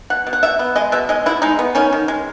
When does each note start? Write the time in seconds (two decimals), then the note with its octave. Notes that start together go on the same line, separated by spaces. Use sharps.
0.10 B2 F#5
0.27 B2
0.33 F#5
0.43 B2 E5
0.59 B3
0.76 G#3 D#5
0.92 B2 E5
1.09 G#3 D#5
1.26 B2 E4
1.42 G#3 D#4
1.59 B3
1.75 D#3 C#4
1.93 D#3
2.08 G#3